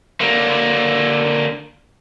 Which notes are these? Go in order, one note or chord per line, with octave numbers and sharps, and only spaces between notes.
D3 A#3